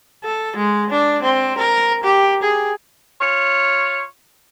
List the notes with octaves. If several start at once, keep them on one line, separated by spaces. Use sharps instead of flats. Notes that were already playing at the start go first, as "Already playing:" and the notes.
A4
G#3
D4
C4
A#4
G4
G#4
F4 C#5